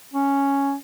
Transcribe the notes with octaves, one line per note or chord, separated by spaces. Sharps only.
C#4